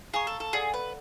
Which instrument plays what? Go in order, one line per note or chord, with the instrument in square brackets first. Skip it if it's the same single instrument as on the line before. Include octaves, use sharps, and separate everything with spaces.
[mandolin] G#4 [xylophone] F5 A#5 C#6
[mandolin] A4
A4
[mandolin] G#4 [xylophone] A4 D5 F#5
[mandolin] B4